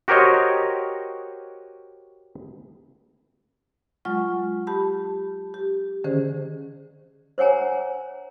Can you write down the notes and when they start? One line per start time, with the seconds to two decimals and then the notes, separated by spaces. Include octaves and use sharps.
0.08 F#4 G4 A#4 C5 C#5 D#5
4.05 F#3 G#3 F4 F#5 C#6 F6
4.67 G4 A5 B5
5.54 G4
6.04 D3 D#3 C#4 G#4 C5
7.38 C5 C#5 F#5 G#5 A#5